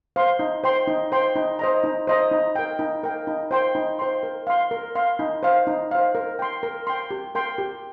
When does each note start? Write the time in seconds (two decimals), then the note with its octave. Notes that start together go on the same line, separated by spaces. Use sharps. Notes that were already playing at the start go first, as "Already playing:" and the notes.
0.16 C5 F5 C6
0.39 D#4
0.64 C5 G5 C6
0.88 D#4
1.12 C5 G5 C6
1.36 D#4
1.59 C5 D#5 A#5
1.84 D#4
2.07 C5 D#5 A#5
2.31 D#4
2.56 A#4 G5
2.79 D#4
3.03 A#4 G5
3.27 D#4
3.51 C5 G5 C6
3.75 D#4
3.99 C5 G5 C6
4.23 A#4
4.47 F5 C6
4.71 A#4
4.95 F5 C6
5.19 D#4
5.43 C5 F5
5.67 D#4
5.91 C5 F5
6.15 A#4
6.39 G5 C6
6.63 A#4
6.87 G5 C6
7.11 G4
7.35 A#4 G5 C6
7.58 G4